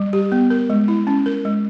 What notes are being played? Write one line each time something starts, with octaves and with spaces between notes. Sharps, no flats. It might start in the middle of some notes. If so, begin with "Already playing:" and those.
Already playing: G3
G4
B3
A#4
G#3
E4
C#4
A#4
G#3